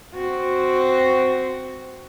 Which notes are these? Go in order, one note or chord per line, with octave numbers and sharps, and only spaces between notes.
C4 F#4